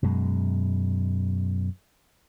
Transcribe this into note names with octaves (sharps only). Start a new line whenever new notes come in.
F#2 B2 G#3